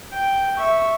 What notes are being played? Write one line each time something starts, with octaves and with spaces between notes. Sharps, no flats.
G5
E5 C#6